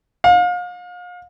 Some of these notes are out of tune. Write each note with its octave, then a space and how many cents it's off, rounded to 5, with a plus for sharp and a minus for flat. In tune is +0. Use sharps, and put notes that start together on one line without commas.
F5 +35